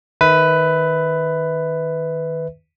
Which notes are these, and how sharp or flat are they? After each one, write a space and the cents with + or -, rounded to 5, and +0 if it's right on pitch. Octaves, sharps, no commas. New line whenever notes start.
D#3 +0 B4 +10 E5 -25